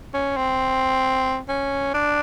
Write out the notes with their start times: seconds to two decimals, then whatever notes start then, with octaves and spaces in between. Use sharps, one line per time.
0.14 C#4
0.37 C4
1.49 C#4
1.94 D4